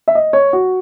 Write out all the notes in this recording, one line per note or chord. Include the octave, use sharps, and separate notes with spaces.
E5
D#5
C#5
F#4